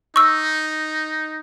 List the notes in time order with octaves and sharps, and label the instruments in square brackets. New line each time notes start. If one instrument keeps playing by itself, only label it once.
[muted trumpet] D#4 [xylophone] C#6 E6